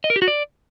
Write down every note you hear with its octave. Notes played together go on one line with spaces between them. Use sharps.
D#5
A#4
G4
F#4
D5